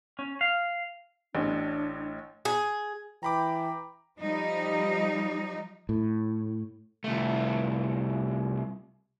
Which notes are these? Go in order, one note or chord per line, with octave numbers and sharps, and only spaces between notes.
C#4
F5
A1 A2 D4
G#4
E3 G5 A#5 B5 D6
F3 G3 D#4
A2
C2 A3